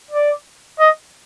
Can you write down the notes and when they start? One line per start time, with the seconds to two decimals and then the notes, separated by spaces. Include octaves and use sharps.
0.11 D5
0.79 D#5